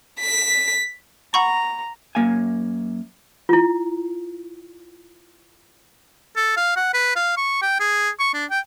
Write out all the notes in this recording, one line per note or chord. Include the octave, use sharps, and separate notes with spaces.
B6
F#5 A#5 B5 C#6
F#2 A#3 F5 G#5
E4 F4
A4
F5
F#5
B4
F5
C#6
G5
G#4
C#6
D4
G5